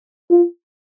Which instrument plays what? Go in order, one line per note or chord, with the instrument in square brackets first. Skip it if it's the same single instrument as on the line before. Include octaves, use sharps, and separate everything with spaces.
[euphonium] F4